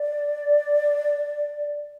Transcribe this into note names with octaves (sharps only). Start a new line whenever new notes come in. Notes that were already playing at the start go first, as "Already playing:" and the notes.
Already playing: D5